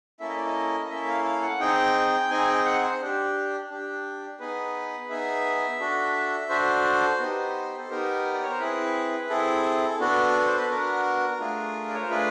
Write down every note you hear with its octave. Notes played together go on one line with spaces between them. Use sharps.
A#3 C#4 E4 A4 E5
D#5
D5
D#5
A#3 C#4 E4 A4 E5
F5
F5
F#5
C4 D#4 G#4 G5
C4 D#4 G#4 G#5
G5
F#5
C5
D4 G4
D4 G4
B3 D#4 G#4 B4
B3 D#4 G#4 E5
D4 F#4 A4
D4 F#4 A4 C5
B3 D#4 G4
A4
B3 D#4 G4 A#4
D5
C#5
C5
C4 E4 G#4 B4
C4 E4 G#4 A4
B3 D4 F#4 A4
C5
B4
B3 D4 F#4 A#4
A3 D4 F4 G#4
D5
C#5
C5
A3 D4 F4 G#4 B4